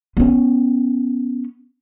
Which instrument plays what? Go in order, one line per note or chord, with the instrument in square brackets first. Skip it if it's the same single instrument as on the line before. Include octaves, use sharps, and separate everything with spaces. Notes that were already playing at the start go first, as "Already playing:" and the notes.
[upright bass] B3 C#4